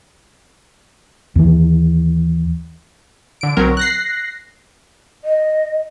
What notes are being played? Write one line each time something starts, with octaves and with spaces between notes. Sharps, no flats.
D#2 E3
D3 D7
B1 F#3 C4 A#4
F#6 A#6 C7
D#5